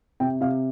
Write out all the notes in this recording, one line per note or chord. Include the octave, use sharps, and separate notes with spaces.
C3 G5
C3 F5